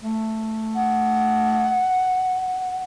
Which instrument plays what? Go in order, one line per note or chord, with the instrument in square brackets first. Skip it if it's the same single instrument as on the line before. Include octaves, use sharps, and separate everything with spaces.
[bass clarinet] A3
[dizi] F#5